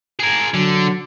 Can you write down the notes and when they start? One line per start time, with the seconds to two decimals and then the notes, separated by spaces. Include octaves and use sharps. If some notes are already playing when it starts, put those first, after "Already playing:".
0.20 G#4 A#4
0.54 D3 F#3